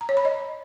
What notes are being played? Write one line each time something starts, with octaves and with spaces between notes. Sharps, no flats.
A#5
C#5
B5
D#5